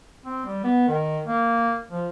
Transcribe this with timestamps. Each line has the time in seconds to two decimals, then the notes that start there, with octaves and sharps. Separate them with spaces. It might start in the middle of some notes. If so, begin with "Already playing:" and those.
0.25 C4
0.46 G3
0.64 B3
0.88 D#3
1.27 A#3
1.92 F3